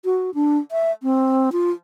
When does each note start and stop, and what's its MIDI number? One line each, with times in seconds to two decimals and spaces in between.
0.05 0.30 66
0.34 0.58 62
0.72 0.92 76
1.03 1.50 60
1.52 1.71 65